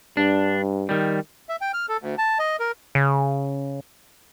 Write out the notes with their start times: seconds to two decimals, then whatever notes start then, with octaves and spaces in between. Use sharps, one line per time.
0.17 G2 D4
0.89 D#3 G3
1.49 E5
1.61 G5
1.73 F6
1.89 A4
2.02 D2
2.18 A5
2.39 D#5
2.60 A#4
2.95 C#3